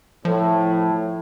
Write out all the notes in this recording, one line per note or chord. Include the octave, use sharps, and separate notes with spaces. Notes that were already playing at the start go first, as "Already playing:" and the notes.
A2 F3